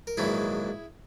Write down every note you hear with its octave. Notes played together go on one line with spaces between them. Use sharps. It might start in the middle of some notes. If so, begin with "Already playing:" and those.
A#4
A#1 G#2 D#3 F#3 B3 E4 G#4